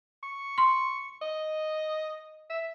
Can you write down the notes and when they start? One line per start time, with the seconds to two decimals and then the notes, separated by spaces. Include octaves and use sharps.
0.23 C#6
0.58 C6
1.21 D#5
2.49 E5